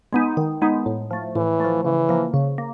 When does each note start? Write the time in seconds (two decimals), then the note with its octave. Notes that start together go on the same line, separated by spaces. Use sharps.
0.13 G#3 B3 D#4
0.37 D#3
0.62 G#3 B3 D#4
0.86 A2
1.11 F3 A3
1.35 A2 E3
1.60 F3 A3
1.84 C#3 E3
2.09 F3 A#3
2.34 C#3
2.58 A#3